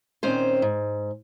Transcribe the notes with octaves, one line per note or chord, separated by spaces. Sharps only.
A#2 D#3 C4 C#4 C5
G#2